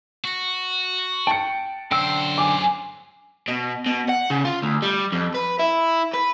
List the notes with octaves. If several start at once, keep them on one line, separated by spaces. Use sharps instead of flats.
F#4
G5 A5 C#7
F#2 D3 C5 G5 E6
G#5 D6
B2
B2
F#5
C#3
F4
D2
G3
F2
B4
E4
B4